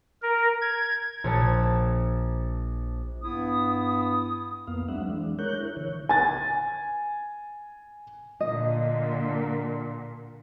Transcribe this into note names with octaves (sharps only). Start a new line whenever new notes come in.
A#4
G#6
A#1 D4 C#5 A5
G2 B3 E4 D#6
F2 A#3 B3 F5
F#3 G#3 C4 D4 E5 F#5
E3 G#3 D4
G#3 A#4 C#5 F#6 G6
E4
D3 E3 C#5
G#5 A6
A#2 D3 D#5